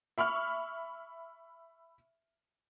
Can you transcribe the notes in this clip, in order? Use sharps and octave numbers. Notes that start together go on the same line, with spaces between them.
E5 B5 C#6 F6